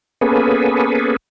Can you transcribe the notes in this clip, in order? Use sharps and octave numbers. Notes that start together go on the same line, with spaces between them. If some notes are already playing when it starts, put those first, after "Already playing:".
A#3 B3 C#4 G#4 A4 B4